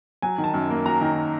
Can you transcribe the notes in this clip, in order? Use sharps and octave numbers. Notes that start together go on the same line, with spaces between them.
F#3 G#5
D#3
A5
F#2
A#3
F#3 A#5
D#3